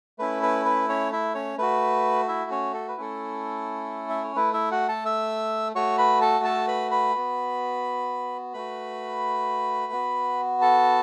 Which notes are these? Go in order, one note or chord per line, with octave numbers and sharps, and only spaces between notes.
A3 C#4 E4 B4
B4
B4
C#4 C#5
E4 E5
C#4 C#5
A3 F#4 B4
E4 E5
C#4 C#5
A4
B4
A3 C#4 E4 A4
E5
C#5
A3 E4 B4
E4 E5
F#4 F#5
A4 A5
E5 E6
A3 F#4 C#5 C#6
B4 B5
A4 A5
A4 A5
B4 B5
B4 B5
B3 F#4
A3 F#4 B4 B5
B3 F#4
A4 A5